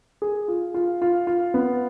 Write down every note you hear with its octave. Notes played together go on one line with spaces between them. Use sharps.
G#4
F4
F4
F4
F4
B3